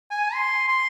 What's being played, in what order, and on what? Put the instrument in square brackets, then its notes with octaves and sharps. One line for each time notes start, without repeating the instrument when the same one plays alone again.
[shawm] G#5
C6
C6